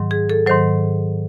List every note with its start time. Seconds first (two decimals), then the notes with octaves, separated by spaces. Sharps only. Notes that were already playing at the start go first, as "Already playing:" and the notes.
Already playing: G#2 D#3 F#3
0.11 G#4
0.30 A4
0.47 G#2 D#3 F#3 C5